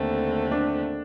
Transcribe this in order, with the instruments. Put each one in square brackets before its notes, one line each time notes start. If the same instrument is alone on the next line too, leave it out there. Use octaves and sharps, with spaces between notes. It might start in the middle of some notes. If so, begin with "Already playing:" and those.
Already playing: [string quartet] D#2 D3 A3 C4
[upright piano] D4